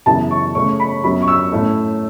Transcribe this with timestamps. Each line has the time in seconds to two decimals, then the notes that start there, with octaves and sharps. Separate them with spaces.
0.06 F#2 C#3 E3 B3 A5
0.31 C#6
0.55 C#3 A3 C#4 C#6
0.80 B5
1.04 F#2 F#3 B3 B5
1.22 C#6
1.28 E6
1.52 A2 A3 C#4